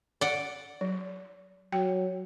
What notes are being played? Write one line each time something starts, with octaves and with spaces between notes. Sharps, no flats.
D5 F#5
F#3
F#3 G5